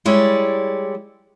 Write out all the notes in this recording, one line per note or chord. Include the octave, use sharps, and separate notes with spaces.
G3 G#3 E4 C#5 D5